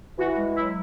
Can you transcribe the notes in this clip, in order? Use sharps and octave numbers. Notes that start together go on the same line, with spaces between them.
E3 F#4
G#3
F#3 E4